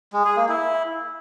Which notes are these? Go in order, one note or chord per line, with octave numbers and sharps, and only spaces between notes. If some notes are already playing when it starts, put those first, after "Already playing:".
G#3
G#4
A#3
E4